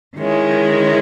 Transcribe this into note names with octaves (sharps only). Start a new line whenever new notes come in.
D#3 G#3 C#4 E4